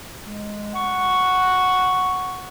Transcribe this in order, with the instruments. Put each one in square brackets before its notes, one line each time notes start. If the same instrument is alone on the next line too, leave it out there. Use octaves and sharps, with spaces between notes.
[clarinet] G#3
[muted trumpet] F#5 [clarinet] C#6